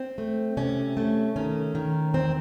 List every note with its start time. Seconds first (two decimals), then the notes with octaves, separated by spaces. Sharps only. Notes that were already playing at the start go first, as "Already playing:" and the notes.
Already playing: C4
0.18 A3
0.57 C3 C#4
0.97 A3
1.36 D#3 C#4
1.75 D#3
2.14 E2 C4